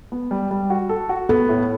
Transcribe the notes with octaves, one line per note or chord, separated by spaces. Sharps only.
B3
G3
G3
F#4
A4
F#4
B3 A4
A2